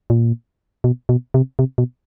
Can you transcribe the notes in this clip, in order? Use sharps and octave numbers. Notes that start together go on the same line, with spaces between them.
A#2
B2
B2
C3
C3
B2